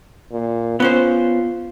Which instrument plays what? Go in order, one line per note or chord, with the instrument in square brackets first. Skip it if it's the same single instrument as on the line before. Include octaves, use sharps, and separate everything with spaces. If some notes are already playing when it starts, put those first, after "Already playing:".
[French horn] A#2
[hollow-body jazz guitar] B3 C#4 C5 [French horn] F4